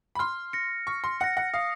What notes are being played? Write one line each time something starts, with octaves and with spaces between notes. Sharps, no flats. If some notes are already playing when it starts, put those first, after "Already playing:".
B5
C6 F6
A#6 C#7
C#6 F6
C6
F#5 A#6 C#7
F#5
F5 D#6